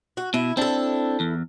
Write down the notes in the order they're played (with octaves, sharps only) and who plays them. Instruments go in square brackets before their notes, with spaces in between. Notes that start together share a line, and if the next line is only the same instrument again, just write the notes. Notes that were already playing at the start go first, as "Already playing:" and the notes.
[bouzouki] F#4
[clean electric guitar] B2 [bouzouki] E4
[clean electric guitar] C4 D4 [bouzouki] E4 A4
[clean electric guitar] E2